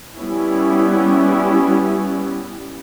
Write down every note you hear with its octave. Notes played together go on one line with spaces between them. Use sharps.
G3 B3 C#4 E4